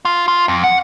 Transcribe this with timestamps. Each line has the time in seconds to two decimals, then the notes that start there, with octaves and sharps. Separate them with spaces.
0.05 F4
0.28 F4
0.48 F2
0.64 F#5